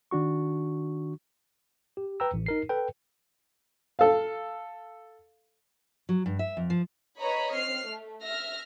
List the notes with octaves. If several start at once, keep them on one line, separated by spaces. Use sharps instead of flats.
D#3 D4 F#4 C#6
G4
B4 G5 A#5 E6
A1
D#4 A#4 C7
A4 B4 G5
A4 F5
F#3
G2
E5
F2
F3
B4 C#5 D#5 A#5 B5
C4 F6 C7
A3
E5 F6 A#6